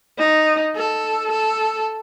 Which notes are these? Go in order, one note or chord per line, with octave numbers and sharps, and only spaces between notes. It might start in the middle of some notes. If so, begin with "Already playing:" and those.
D#4
A4
A4